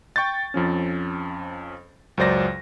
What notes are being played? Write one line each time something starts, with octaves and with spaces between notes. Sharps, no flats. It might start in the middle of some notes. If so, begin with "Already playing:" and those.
G5 C#6 G6 A6
F2 F3 C#4
C#2 F#2 F#3 C5 D5 A#6